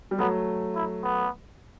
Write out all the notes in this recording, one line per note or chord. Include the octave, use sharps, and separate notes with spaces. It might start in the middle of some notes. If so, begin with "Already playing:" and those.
G3
F#3 A3 B3
E4
B3